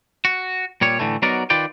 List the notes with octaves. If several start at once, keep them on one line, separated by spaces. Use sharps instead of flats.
F#4
A#2 G3 C#5
A2 D3 E3 A3
F#3 B3 D#4 F#4 A#4 D5
D#3 F4 B4 D5 G5